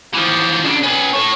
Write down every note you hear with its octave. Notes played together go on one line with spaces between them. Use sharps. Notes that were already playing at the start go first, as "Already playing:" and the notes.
E3 F3
C#3 D4
C#4 B4
A4 C#5